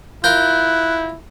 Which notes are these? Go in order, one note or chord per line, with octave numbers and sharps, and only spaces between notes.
E4 F4 A#4 F#6 G6